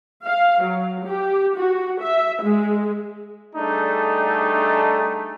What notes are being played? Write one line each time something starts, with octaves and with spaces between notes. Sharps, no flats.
F5
F#3
G4
F#4
E5
G#3
G3 A3 D4 D#4 G#4 A4